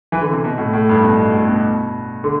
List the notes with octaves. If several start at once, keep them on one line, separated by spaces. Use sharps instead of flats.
E3
D3
C3
B2
A2
A2
G2
B2
B2
A2
B2
D3